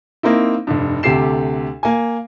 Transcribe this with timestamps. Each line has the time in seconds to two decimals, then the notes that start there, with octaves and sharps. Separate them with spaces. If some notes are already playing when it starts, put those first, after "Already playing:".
0.23 A#3 C4 D#4 E4
0.67 F1 G2
1.03 D2 C3 G4 A4 C7 E7
1.83 A#3 G#5